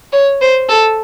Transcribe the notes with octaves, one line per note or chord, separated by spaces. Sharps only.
C#5
C5
A4